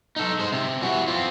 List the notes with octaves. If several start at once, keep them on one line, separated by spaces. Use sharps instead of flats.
D#4 A4
G#3 C5
C3
E3 F#4
C4 F4